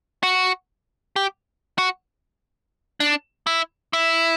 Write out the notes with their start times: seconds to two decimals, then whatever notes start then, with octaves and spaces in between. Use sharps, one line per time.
0.23 F#4
1.16 G4
1.78 F#4
3.00 D4
3.47 E4
3.93 E4